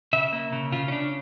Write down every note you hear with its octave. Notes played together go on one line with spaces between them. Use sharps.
C#3 E5
A#3
C#3
C#3 F4
C#4
C#3 D4